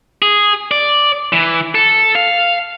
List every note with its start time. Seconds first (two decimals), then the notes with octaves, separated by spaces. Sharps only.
0.22 G#4
0.71 D5
1.33 E3
1.75 A4
2.15 F5